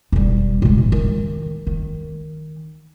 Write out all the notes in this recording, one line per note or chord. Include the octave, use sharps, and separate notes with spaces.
E1 G3
B2 G#3
A2
D#3
D#3